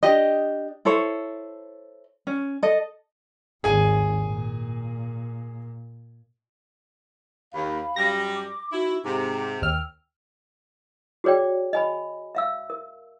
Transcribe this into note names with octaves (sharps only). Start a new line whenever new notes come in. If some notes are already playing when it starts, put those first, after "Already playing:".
D4 G4 D#5
E4 A4 C5 C#5
C#4
A4 D#5
G#1 D#2 G#4 G#5
A#2
D#2 F5 B5
F#2 G3 A#6
D6
D#4 E4 F#4
G#2 C3 A#5 D6
D#2 G5 E6 F6
F#4 G#4 C#5 D5 G5
D#5 G#5 B5
E5 F5 E6
A#4